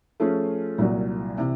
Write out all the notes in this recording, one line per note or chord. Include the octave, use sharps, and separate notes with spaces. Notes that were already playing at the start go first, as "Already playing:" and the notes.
F3 A3 C#4 F4 G#4
C2 A#2 F#3
C3 E3